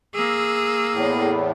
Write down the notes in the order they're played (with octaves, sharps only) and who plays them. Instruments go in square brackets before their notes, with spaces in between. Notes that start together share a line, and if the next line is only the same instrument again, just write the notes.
[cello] A#3 G#4 [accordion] E6
[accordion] E2 A2